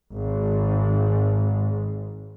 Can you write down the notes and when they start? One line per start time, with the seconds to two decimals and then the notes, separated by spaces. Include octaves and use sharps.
0.13 G#1 G#2